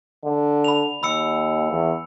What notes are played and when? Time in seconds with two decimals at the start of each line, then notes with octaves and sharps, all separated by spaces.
0.25 D3
0.64 B5 F7
1.03 D#2 B5 E6 C#7
1.70 E2